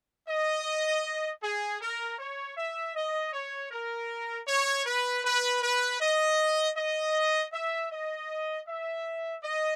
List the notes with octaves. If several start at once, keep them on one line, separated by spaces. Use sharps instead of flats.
D#5
G#4
A#4
C#5
E5
D#5
C#5
A#4
C#5
B4
B4
B4
D#5
D#5
E5
D#5
E5
D#5